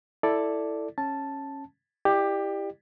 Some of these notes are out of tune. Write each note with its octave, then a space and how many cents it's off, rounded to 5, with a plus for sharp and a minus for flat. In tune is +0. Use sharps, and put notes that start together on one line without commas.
E4 +0 A4 +5 D5 +0
C#4 -15 A5 +0
E4 +0 G4 +15 D5 +35